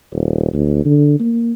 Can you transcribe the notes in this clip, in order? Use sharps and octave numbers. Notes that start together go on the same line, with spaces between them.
D#1
D2
D3
A#3